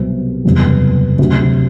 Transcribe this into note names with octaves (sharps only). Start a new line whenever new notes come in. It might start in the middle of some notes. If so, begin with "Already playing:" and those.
Already playing: C2 B2 F#3 C4
F#1 E2 C3 G3 B3
D2 C3 F#3 C4 F#4